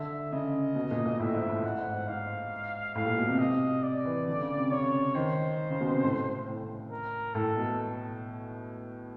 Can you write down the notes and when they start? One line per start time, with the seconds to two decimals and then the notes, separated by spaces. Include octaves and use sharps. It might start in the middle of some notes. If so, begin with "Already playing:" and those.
Already playing: D3 E5
0.32 C#3 D#5
0.75 B2
0.91 A#2
1.05 A#2
1.19 A2 E5
1.34 G#2
1.49 A2
1.63 A2 F#5
1.78 G#2
1.93 G#2
2.08 G#2 F5
2.95 A2 F5
3.07 A#2
3.18 B2
3.29 C3
3.39 D#5
3.83 D5
4.05 E3
4.27 D3
4.41 C#3
4.57 C3
4.71 C#3 C#5
5.15 D#3 C5
5.70 C#3
5.80 B2
5.91 C3
6.04 A2
6.47 A2
6.91 A#4
7.34 A2 A4
7.57 B2